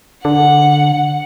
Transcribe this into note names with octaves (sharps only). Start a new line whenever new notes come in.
D3 F#5